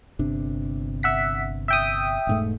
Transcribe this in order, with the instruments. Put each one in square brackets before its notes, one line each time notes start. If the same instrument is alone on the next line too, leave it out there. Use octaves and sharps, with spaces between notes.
[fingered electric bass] G1 C3 D4
[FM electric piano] E5 F#5 B6
E5 G5 D#6
[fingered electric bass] E1 G#2 A3